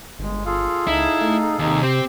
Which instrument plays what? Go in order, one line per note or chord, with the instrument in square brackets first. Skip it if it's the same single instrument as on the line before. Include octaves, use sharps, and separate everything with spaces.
[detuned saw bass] G1 [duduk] G#3
[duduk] F4 [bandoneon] G#4 A4 F5
[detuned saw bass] C#2 [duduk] D#4 [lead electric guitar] E4
[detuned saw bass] A3
[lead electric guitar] D#2 [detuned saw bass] C3 [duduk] D#4
[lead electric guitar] C4 [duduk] G4